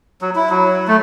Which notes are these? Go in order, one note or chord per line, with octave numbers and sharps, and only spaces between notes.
F#3
E4
F#3
A3